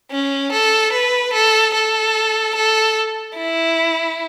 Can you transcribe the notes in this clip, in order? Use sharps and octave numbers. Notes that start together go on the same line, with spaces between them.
C#4
A4
B4
A4
A4
A4
E4